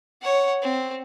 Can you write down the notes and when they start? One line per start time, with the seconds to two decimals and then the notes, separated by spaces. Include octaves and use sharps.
0.21 C#5 F#5
0.62 C4